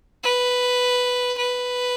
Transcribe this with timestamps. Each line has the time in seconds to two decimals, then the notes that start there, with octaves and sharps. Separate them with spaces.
0.23 B4
1.37 B4